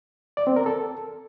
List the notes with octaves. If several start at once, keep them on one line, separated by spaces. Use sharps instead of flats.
D5
C4
A#4
A4